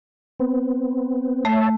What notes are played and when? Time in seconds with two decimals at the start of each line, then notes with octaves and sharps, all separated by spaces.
0.40 B3 C4
1.45 A3 C#5 E5 A5